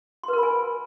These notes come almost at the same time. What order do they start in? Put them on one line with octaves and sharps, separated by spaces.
C6 B4 A#4 B5 G#5